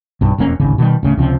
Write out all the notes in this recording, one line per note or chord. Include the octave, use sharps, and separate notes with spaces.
B1 G2
E1 F2 A#3 C#4
D1 G#1 C#3
B2 D#3 F3 G3
D1 C#3 A3
C#2 C3 F3